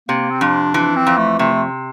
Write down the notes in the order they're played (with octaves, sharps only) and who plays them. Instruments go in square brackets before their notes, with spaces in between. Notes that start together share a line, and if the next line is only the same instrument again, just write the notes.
[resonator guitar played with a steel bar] C3 [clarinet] A#3
[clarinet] C4
[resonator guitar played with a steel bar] F2 [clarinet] D4
[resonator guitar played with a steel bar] E3 [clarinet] D4
[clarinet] C4
[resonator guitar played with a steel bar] F2
[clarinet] A3
[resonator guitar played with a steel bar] C3 [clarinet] A3